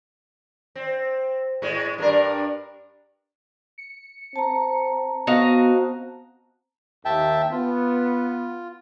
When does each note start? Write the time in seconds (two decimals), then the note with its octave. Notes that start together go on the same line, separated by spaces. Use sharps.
0.75 C4
1.62 A2 G#3
1.98 G2 D4 A#4
3.78 C#7
4.36 C4 A5 A#5
5.27 B3 C4 F#4 D#5 F5
7.05 D#2 E5 G5 A5
7.51 B3 F4